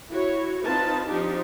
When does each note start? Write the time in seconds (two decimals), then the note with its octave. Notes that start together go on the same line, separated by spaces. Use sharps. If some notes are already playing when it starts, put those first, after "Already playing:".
0.10 E4 F#4 C#5
0.63 C4 D#4 F4 B4 A5
1.06 F3 C4 D4 D#4 G4